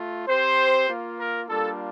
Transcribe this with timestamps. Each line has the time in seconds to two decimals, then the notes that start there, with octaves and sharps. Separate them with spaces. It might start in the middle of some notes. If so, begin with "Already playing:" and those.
Already playing: A3 F4
0.26 C4 G4 C5
0.87 A#3 F4
1.17 A#4
1.47 G3 A#3 D4 F4 A4